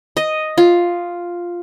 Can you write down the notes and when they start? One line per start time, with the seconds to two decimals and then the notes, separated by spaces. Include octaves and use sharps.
0.17 D#5
0.58 F4